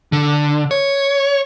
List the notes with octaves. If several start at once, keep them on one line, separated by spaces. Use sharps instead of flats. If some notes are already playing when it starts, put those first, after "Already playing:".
D3
C#5